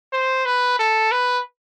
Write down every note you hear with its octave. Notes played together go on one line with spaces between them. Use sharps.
C5
B4
A4
B4